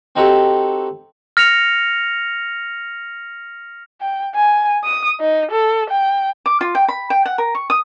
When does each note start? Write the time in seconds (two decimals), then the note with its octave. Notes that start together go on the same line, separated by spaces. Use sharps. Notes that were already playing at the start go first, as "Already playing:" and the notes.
0.16 C4 D#4 F#4 G4 A4
1.37 F6 A#6 C#7 F7
4.01 G5
4.35 G#5
4.84 D#6
5.21 D#4
5.51 A4
5.90 G5
6.46 D6
6.61 F4
6.75 G5
6.89 B5
7.10 G5
7.26 F#5
7.38 A#4
7.55 C#6
7.70 D#6